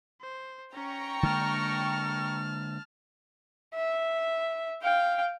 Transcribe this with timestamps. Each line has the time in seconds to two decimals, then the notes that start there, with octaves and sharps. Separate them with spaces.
0.21 C5
0.74 C#4 G5 A#5 C#6
1.23 D3 G#3 A#3 A5 F6
3.74 E5
4.82 F5 G5